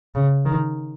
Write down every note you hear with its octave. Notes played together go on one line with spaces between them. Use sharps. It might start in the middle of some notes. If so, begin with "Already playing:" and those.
C#3
D#3